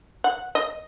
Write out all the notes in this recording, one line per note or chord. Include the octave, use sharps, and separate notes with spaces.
F#5
D#5